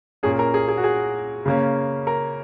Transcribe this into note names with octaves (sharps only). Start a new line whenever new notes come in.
A#2 A#3 C#4 G#4
A#4
G#4
G#4
F#4
G#4
C#3 A#3 C#4
A#4